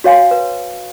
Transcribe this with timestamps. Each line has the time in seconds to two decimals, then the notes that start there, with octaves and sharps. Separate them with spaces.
0.04 F#4 C#5 F5 G#5 C6
0.31 B4